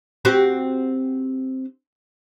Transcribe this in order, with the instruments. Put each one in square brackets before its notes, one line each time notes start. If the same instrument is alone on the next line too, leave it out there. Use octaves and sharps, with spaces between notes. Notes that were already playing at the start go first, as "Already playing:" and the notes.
[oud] C4 F#4 G4